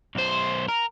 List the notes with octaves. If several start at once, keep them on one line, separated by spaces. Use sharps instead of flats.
B1 C5
A#4